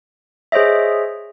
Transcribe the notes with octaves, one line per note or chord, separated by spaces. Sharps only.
G#4 C5 C#5 D#5 E5